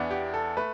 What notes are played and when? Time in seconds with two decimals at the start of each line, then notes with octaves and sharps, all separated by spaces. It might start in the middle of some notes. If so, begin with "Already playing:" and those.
Already playing: E2 E3 B3 D4
0.11 G4
0.34 A4
0.57 A3 B4